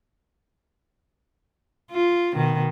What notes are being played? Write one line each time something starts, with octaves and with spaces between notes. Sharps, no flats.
F4
B2 D#3